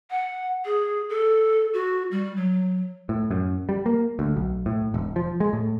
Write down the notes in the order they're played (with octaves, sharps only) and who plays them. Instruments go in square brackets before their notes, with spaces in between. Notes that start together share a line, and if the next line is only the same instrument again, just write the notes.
[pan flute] F#5
G#4
A4
F#4
G3
F#3
[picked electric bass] A2
F#2
G3
A#3
D2
B1
A2
E1
F3
G#3
A2